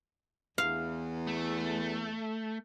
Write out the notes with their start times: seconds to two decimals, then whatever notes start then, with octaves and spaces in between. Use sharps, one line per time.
0.58 E2 F5
1.27 A3